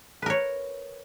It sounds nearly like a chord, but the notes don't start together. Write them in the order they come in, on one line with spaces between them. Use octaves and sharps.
B4 A#4 C#5